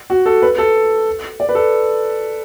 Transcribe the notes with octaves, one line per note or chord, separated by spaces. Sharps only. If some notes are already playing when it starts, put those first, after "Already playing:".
F#4
A4
B4
A4
D5
B4
A4